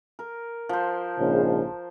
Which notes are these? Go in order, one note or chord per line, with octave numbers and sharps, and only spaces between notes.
A#4
F3 C5
A#1 G#2 C#3